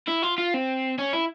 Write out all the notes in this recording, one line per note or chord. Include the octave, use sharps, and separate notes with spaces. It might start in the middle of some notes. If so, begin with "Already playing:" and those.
E4
F4
F4
C4
C#4
E4